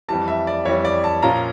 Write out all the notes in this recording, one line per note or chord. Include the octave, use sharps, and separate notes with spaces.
F2 E3 G3 A5
E5
D5
F2 E3 G3 C#5
D5
A5
A#2 F3 C#4 F4 A#5